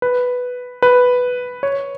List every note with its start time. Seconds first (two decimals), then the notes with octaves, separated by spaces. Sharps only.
0.02 B4
0.82 B4
1.63 C#5